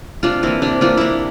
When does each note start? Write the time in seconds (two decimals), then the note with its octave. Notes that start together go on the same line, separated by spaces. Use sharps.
0.23 C3 D4 F4
0.43 E3 A#3 C4 E4
0.62 C3 D4
0.81 E3 A#3 D4 F4
0.97 C3 D4 E4